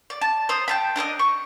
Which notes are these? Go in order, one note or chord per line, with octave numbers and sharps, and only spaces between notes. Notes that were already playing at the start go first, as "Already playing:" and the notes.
D5
A5
C5 A#5 D#6
G5 A5 B5
D4 A#4 B4 D#5
C#6